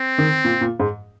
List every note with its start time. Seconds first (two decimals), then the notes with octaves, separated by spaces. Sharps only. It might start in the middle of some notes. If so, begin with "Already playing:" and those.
Already playing: C4
0.18 D#3
0.45 A#2
0.61 A#2
0.80 G#2